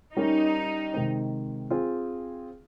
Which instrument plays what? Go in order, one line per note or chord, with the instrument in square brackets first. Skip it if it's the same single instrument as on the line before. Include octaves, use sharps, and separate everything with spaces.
[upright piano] G3 C#4 G4 A#4 [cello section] D#4
[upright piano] C3 D#3 G#3 C4
C4 F4 G#4